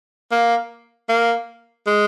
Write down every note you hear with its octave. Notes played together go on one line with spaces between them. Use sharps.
A#3
A#3
G#3